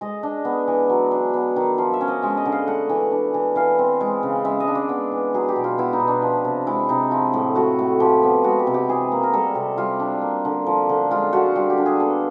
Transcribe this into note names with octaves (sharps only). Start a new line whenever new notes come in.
G#3 D#5
D4
B3
E3
F#3
D4
B3
D#3
F3 F5
E5
C#4
D#5
G#3 E5
D#5
D3
F5
A3 F#5
E3
D4
E3
E3 F5
C4
G#3
C#3
G#3 E5
D#5
D4
D5
B3
E3
F#3 G#4
G4
B2
F4
B3 E4
D#4
B2
D4
F3
C3
G#3 E4
C3 D#4
F3 E4
A2
A3 F#4
A2
F3 G4
B3
G#3 F#4
G4
C3
G4
E3 G#4
A#3
A#4
G3 A4
C3
G3 F4
D4
A#3
D3
F3
D3
G#3 F4
D3 F#4
G3 F4
G4
D4
G#4
B3 A4